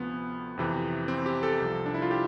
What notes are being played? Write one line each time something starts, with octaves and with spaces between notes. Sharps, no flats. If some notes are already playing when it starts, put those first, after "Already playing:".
Already playing: D2 C3 F3 B3
F2 C3 E3
C4
G4
A4
C2 C3 F3
D4
E4
F4
G4